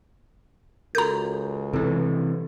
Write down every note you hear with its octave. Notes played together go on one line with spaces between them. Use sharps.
C#2 F#4 A4 A#4 A#5 G6
C3 E3 A4 B4